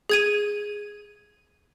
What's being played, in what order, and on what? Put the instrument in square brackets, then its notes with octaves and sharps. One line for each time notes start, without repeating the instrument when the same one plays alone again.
[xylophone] G#4 G#6 D#7